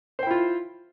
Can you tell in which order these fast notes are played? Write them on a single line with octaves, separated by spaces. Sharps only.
C5 G5 E4 F4